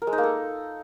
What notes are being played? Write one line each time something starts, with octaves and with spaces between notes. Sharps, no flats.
A#4
G#3
D#4
A#3
A4